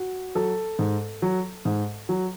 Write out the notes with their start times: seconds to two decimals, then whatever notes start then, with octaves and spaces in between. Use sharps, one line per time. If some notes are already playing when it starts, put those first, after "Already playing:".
Already playing: F#4
0.35 F#3 A4
0.79 G#2
1.22 F#3
1.65 G#2
2.09 F#3